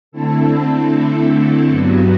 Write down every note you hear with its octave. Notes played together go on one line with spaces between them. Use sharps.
D3 A3 C4 E4 A4
G2 F#3 B3 F#4